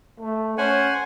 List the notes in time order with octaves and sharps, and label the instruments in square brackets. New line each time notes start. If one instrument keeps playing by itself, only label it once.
[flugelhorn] A3
[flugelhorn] C#4 [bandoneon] C5 F#5 G#5